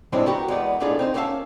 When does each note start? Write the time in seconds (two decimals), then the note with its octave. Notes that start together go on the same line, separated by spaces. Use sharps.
0.12 A2 F3 G#3 C4 D4 E4
0.26 B3 F#4 G4 A#4
0.48 E2 G#3 A#3 B3 D5
0.80 B1 A2 D4 F4 G#4 A4
0.99 C4 D#4 C5
1.14 A#3 B3 C#4 E5 F5 A5